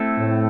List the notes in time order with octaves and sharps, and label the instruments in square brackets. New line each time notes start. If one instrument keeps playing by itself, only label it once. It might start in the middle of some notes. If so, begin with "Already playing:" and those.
Already playing: [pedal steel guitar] A3 C4 E4 A4
[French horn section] A2